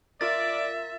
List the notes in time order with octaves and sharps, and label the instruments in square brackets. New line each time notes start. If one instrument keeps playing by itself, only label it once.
[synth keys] F4 A#4 [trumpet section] D5 [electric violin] E5 [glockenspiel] A6